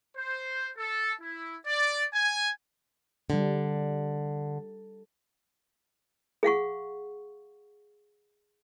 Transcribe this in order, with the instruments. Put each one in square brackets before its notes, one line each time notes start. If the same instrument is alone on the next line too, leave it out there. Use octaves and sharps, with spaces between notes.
[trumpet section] C5
A4
E4
D5
G#5
[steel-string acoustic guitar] D3 [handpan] G3 D4
[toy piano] G#4 F5 F#5 C#6